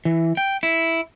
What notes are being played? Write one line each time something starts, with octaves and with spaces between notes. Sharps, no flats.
E3
G5
E4